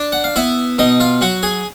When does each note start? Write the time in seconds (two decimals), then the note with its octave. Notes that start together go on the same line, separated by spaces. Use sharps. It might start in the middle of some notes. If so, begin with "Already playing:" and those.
Already playing: D4 D5
0.12 F#5
0.24 F5
0.36 B3 E4 E5
0.79 B2 D#4 D#5
1.00 F4 F5
1.21 F#3 F#4 F#5
1.43 G#4 G#5